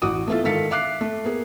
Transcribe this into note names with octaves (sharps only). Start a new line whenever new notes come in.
A1 F#4 F#5 D6 D#6
A3 B3 E4 F4 A4
G#2 D#3 A4 F5 B6 C#7
E5 F5 D6 F#6 C7
A3
A#3 B3 G#4